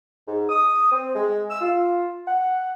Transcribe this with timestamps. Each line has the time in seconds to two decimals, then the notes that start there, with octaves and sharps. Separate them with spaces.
0.27 G#2
0.50 D#6
0.91 C4
1.15 G#3
1.50 E6
1.61 F4
2.27 F#5